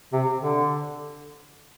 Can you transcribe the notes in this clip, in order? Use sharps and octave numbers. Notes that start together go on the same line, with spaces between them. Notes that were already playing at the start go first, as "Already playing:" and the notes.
C3
D3